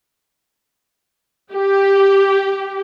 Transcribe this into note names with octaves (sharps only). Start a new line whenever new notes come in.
G4